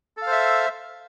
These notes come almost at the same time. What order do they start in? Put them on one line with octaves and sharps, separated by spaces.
A4 F5 C5 E5